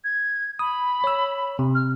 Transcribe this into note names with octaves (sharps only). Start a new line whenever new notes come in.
G#6
B5 D#6
C#5 E6
C3
F6